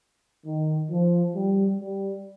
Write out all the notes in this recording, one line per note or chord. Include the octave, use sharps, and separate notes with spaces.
D#3
F3
G3
G3